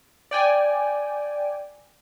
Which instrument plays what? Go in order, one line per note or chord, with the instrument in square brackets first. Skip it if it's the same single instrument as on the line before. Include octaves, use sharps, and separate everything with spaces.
[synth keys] D5 G5 G#5